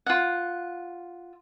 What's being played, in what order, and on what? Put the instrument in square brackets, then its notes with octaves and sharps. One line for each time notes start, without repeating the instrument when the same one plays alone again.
[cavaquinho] F4 F#5